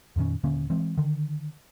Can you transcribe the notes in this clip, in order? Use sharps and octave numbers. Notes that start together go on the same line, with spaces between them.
F2 A#2 D#3 C#4
D#1 D3 A#3 C#4
E3 G#3 C4
D3 D#3